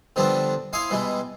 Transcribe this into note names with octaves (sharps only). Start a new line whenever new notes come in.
D3 F3 G3 B3 C4 D4
E4 F5 G#5 C6 D#6
B2 G3 G#3 E4